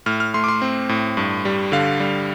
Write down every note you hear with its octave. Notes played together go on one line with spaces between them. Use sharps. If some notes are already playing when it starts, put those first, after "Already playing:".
A2 F6
F6
A3 C6
D6
C6
C4
A2
G2
G3
D3 F5
G3